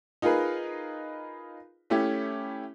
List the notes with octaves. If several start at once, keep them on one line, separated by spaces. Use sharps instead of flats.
D#4 F4 G#4 A#4 B4
A3 C#4 E4 G4